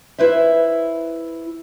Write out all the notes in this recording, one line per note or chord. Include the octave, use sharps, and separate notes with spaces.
E4 B4 C5 E5